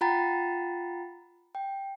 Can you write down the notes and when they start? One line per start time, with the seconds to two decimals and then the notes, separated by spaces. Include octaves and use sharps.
0.01 F4 F#5 G5 A#5 B5 A6
1.55 G5